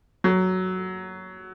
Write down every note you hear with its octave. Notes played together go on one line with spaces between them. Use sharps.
F#3